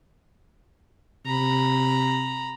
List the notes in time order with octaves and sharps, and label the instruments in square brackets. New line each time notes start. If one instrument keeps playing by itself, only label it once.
[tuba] C3 [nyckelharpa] A#5 B5